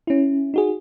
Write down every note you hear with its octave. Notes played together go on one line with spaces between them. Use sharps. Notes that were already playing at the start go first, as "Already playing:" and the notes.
C#4 E4
D#4 F#4 G#4